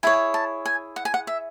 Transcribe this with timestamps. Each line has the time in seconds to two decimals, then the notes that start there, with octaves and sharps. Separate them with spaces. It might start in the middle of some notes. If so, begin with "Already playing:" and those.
0.03 E4 G#4 C#5 G#5
0.34 A5
0.66 G#5
0.96 F#5
1.05 G#5
1.14 F#5
1.27 E5